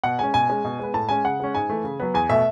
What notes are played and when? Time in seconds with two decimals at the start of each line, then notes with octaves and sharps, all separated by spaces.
0.04 B2 F#5
0.19 G#3 C#4 G#5
0.34 B2 G#5
0.50 G#3 C#4
0.65 B2
0.79 G#3 B3
0.94 A2 A5
1.09 G#3 C#4 G#5
1.25 C#3 F#5
1.40 G#3 C#4
1.55 G#2 G#5
1.70 E3 A3
1.84 C#3
2.00 F#3 B3
2.14 E2 G#5
2.29 B2 A3 E5